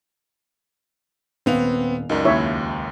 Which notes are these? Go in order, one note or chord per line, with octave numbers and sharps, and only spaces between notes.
D#1 B3 C4 F5 F7
C#2 F#2 D#4 A#4 D5
D#2 E4 C#5 E5